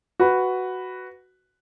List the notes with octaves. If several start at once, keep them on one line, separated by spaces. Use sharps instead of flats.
F#4 B4